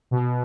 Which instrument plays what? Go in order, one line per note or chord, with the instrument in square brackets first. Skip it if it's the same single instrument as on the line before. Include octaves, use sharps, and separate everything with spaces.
[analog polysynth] B2